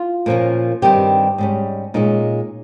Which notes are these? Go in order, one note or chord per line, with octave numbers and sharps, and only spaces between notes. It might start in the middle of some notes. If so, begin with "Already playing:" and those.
Already playing: F4
A#2 F3 A#3 C#4
G2 D#3 G3 C4 G4
G#2 G3 C#4
A#2 G#3 C#4 D#4